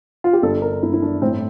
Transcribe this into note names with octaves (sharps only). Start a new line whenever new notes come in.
F4
G4
G1 A4
A#4
G1 E4
E4
D4
A2 C4